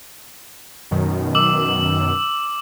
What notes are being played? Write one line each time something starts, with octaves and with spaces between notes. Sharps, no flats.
F#2 B2 D#3
D6 E6 F#7